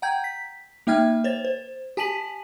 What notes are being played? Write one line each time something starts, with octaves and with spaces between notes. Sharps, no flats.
F#5 G5 A#5 G6 G#6
B6
A#3 D#4 E5 G5 F6 G#6
C5 C#5 A6
C5
G4 G#5 A5 B6 D#7 F#7